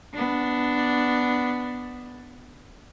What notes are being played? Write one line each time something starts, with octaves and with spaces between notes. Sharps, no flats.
B3 D4